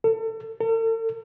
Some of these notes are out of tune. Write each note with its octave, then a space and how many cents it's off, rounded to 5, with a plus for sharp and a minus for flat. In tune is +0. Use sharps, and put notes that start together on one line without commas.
A4 +35
A4 +45